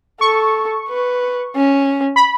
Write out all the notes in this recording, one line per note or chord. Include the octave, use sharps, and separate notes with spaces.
A4 C#6
B4
C#4
B5